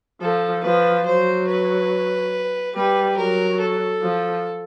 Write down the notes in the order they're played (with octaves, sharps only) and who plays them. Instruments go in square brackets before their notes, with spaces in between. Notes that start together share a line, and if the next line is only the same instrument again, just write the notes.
[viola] F3 [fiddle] A4
[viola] F3 [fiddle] B4
[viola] F#3 [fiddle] C5
[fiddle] B4
[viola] G3 [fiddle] B4
[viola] F#3 [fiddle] A#4
[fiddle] A4
[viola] F3